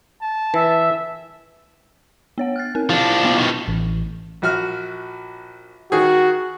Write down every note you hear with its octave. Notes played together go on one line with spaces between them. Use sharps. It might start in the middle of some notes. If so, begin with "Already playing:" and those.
A5
E3 E5
B3 C#5 F#5
F6 F#6 A6
C4 A#4
F3 D4 E4
B3 E4 A6
B2 D#3
A1
A#1 F#4 F6
D#3 F#4 G#4